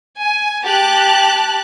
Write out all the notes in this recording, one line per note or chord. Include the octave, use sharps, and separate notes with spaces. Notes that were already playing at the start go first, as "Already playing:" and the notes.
G#5
G4 A5 F#6